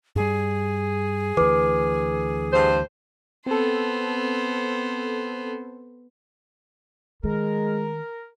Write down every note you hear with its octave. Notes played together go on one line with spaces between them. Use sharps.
G2 G3 G#4
D2 E3 B4 D6
G2 C5
B3 C4 A4 C5
D#3 G#3 A3 A#4